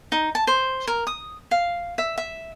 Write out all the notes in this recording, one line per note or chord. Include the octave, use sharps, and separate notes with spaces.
D#4
A5
C5
A#4
D#6
F5
E5
E5